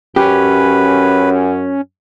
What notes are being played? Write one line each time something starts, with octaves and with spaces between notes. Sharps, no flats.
F#2 C#4 G4 B4